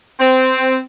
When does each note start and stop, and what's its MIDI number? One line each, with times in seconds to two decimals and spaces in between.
0.20 0.78 60